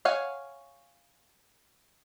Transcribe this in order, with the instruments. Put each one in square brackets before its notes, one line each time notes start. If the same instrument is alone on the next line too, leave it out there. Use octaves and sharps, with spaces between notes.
[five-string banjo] C#5 F5 F#5 G#5